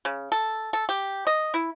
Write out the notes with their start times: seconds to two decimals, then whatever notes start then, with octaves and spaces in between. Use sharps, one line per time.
0.05 C#3
0.32 A4
0.73 A4
0.89 G4
1.27 D#5
1.54 E4